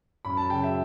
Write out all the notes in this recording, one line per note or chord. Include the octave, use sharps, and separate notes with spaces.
F#2 B5
A5
C#3 F#3 G5
E5